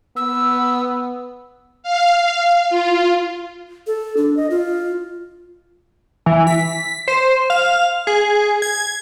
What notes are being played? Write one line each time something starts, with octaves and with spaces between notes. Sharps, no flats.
B3 E6
F5
F4
A4
D4
D#5
F4
E3
B6
C5
F5
G#4
G#6